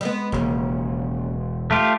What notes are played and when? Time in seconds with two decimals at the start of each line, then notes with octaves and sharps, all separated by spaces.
0.01 G3 G#3 B3
0.32 E1 D#2 C#3
1.71 A3 F4 G4